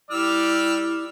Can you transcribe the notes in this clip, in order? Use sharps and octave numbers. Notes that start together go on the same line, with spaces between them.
G3 E4 D5 E6 F6